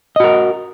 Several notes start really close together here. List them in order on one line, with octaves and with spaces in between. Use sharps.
D#5 F#4 A#4